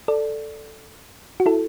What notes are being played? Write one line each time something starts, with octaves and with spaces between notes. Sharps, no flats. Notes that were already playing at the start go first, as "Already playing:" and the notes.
A4 D5
F#4
E4 A4